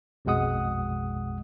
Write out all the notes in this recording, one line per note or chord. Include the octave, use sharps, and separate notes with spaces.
A#1 F2 B2 G#3 F#5 D#6